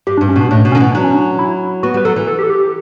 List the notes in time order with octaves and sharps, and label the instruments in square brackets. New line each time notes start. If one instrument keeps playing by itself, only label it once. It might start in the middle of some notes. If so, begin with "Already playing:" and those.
[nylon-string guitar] G2 [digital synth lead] G4
[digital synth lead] D4
[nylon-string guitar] G2
[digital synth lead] C#4
[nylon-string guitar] B2 [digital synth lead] D4
[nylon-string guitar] A2 [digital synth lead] D4
[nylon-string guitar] B2
[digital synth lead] C#4
[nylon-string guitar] D3
E3
[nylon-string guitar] F#3 [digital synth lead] D4
[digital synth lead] C#4
D4
E4
[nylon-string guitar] B3 [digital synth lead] F#4
[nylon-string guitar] G3 [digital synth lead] B4
[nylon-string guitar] F#3 [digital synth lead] A4
[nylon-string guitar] E3
[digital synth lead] A4
G4
A4
G4
G4